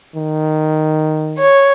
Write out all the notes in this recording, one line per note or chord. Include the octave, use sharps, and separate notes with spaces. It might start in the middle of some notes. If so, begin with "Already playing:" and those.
D#3
C#5